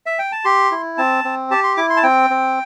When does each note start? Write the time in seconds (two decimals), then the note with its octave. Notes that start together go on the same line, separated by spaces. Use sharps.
0.06 E5
0.19 G5
0.32 A5
0.45 G4 C6
0.71 E4
0.98 C4 A5
1.24 C4
1.51 G4 A5
1.64 C6
1.77 E4 D6
1.90 C6
1.97 A5
2.03 C4 G5
2.30 C4